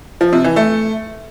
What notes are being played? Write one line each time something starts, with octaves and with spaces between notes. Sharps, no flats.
F3
C3
E3
A3